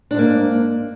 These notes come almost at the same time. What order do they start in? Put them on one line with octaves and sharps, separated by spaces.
D4 G#2 A#3